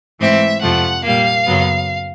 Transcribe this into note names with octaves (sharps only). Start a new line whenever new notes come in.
G#2 E3 A3 C4 E5
F2 C3 F3 A3 F#5
A#2 G3 A#3 F5
F#2 C#3 F#3 B3